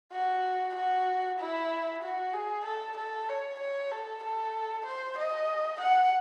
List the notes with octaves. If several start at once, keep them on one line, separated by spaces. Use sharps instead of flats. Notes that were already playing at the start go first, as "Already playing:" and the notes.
F#4
F#4
E4
F#4
G#4
A4
A4
C#5
C#5
A4
A4
C5
D#5
F#5